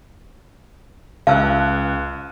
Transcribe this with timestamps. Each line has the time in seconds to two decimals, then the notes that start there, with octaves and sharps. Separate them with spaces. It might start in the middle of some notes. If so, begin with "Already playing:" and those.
1.27 C#2 F5 A5 E6 F#6